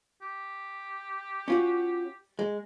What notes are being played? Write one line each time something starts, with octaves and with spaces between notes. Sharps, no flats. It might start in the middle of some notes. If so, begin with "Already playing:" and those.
G4
C#4 F4 F#4
G#3